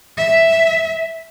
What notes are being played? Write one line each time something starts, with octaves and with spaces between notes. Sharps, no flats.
E5